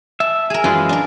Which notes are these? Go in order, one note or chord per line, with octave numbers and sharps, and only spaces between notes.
E5 A5
G#4 A#4
F#2 E3 G#3 F4 B4
D4 A#4